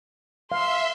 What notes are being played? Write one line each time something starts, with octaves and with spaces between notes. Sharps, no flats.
E5 F5 C6